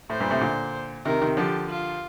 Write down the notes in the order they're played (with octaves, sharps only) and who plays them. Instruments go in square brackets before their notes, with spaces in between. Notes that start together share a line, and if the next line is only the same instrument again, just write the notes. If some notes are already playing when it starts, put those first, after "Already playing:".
[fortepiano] A2 [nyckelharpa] C5
[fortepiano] G2 A#2
A2 C3
A#2 D3
[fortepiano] C3 D#3 [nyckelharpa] A#4
[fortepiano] C3 D#3
[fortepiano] D3 F3 [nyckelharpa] G4
[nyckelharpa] F4